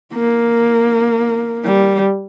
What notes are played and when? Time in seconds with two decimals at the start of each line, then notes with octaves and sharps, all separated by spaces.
0.14 A#3
1.65 G3